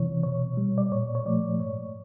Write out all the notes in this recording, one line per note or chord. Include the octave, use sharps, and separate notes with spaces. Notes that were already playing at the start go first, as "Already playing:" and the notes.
Already playing: C3 E3 C#5
B2 C#5
G3
D5
A#2 C#5
C#5
F3 A3 D5
G#2 C#5